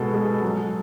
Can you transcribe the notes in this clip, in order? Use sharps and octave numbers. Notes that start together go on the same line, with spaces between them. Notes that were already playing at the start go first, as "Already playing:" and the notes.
Already playing: B2 G#3 A4
G#3
F#3